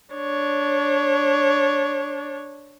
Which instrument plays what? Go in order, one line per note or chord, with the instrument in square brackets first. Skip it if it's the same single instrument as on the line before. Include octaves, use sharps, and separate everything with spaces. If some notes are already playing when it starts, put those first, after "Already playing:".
[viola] D4 C#5